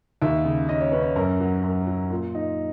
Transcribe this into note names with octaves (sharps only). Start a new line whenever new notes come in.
D#2 E5
C#3
C#4 D#5
C#5
C#4 B4
C#5
F#2 A#4
F#3
F#2
F#3
A#2
D#4